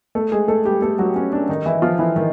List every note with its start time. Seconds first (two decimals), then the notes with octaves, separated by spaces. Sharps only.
0.15 A3 A4
0.32 G#3 G#4
0.48 A3 A4
0.65 G3 G4
0.82 A3 A4
0.99 F#3 F#4
1.16 C#4
1.33 D4
1.49 D#3 D#4
1.66 E3 E4
1.82 F3 F4
1.99 E3 E4
2.16 D#3 D#4